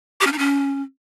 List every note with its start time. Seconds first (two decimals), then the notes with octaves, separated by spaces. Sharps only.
0.21 G4
0.27 C#4
0.32 D#4
0.38 C#4